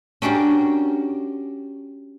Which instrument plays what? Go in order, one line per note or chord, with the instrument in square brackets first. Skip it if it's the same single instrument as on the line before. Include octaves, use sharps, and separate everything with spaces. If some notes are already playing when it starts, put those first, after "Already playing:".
[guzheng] C#4 D4 F#4 G4 A#4